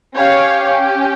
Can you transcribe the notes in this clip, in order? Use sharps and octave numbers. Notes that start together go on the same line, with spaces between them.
C#4 G4 C#5 F5